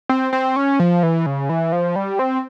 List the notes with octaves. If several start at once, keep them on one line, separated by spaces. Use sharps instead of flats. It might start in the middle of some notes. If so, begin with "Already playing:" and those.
C4
C4
C#4
F3
E3
C#3
E3
F3
G3
C4